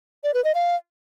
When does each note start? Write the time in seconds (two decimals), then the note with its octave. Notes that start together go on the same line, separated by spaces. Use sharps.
0.24 D5
0.34 B4
0.44 D#5
0.55 F5